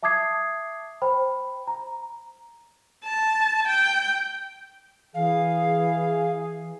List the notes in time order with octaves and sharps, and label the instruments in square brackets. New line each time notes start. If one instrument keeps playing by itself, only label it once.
[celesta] E5 A5 D6 D#6 G#6 C7
C5 G5 B5
A#5
[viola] A5
G5
[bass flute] E3 [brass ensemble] G#4 [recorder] F5